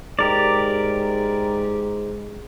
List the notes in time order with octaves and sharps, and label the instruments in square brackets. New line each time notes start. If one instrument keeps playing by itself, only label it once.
[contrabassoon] G#2 [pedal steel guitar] G4 A#4 D5